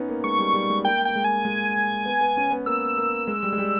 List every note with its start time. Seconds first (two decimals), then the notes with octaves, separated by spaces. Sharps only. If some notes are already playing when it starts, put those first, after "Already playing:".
Already playing: B3 C#4 D#4
0.09 A#3
0.24 G#3 C#6
0.39 G3
0.54 G3
0.70 G#3
0.84 A#3 G5
1.05 A#3 G5
1.15 G#3
1.24 G#5
1.45 G#3
2.05 B3
2.21 B3
2.37 C#4
2.51 B3
2.66 A#3 E6
2.97 A#3
3.27 G#3
3.43 G3
3.53 G#3
3.58 G3